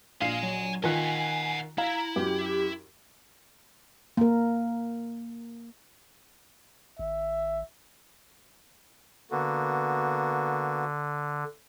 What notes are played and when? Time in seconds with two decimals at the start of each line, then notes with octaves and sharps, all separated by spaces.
0.21 A#1 F5 G#5 C6 C7
0.43 F#3
0.84 D#3 F4 D#5 F#5 G#5 F#6
1.78 E4 F5 A#5
2.16 F#2 G4
4.17 A#3 A#4
6.99 G#1 E5
9.31 D3 A#3 B3 F#4